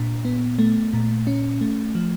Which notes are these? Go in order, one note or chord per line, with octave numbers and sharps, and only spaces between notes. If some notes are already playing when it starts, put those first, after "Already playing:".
Already playing: A#2 D4
B3
A3
A#2
C#4
A3
F3